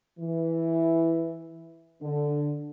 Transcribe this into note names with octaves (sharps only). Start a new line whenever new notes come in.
E3
D3